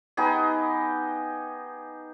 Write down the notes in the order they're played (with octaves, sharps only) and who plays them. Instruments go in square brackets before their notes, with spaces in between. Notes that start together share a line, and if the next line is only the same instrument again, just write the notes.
[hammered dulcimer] B3 D#4 G4 G#4